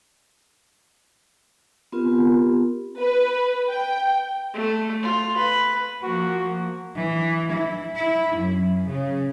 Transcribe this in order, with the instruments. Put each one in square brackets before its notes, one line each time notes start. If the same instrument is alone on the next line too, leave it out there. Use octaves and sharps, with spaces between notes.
[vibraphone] B3 C4 F4 G4 A#4
[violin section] B4
G5
[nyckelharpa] A3
F4
B4
[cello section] F3 A#3 [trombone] F#4
[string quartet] E3
E4
E4
F#2
C#3